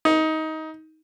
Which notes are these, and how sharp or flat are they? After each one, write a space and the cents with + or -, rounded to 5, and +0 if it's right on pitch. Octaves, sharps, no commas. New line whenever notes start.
D#4 +20